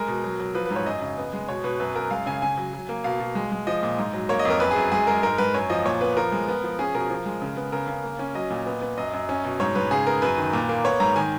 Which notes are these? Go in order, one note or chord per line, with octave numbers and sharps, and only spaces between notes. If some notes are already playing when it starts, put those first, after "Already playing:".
Already playing: G#3 A#4
B2
F#3
F#3
F3 B4
B4
G#2
C#5
F#2 D#5
C#3
B3
G#3
B2 C#5
B2 B4
F#2 B4
F#2 A#4
G#3 F5
C#3 G#5
C#3 G#5
F#3
F#3
A#3
B2 F5
B2
G#3
G#3
F3 D#5
A#2
G#2
F#3
A#3 C#5
D#5
F2
A#4
F#2 B4
G#4
F#2
G#3 G#4
G#3 A#4
G#2 A#4
G#2 B4
F#2 C#5
F3 D#5
A#2 C#5
B3 B4
F3 A#4
G#3
B3
F3
C#4 G#4
B2 A#4
F3
G#3
C#3
B3
C#3 A#4
C#3
A#3
C#4
F#3 D#5
A#2
B3
B3
F#2 D#5
F#2
C#4
B2
G#2 C#5
G#2 B4
C#3 G#4
B3 A#4
F#2 B4
D#3
A#2
A#3
B3 C#5
G#2 A#5
D#3 G#5